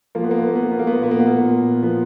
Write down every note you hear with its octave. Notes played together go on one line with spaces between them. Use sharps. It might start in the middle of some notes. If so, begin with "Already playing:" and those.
F3 A#3
B3
A#3
B3
A#3
F3 B3
A#3
B3
A#3
B3
A#3
A#2 B3
A#3
B3
A#3
A#2
F3 B3